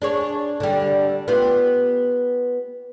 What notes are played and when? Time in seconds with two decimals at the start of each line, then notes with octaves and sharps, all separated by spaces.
0.02 D4 G#4 C#5
0.60 D3 G3
1.28 B3 F4 G4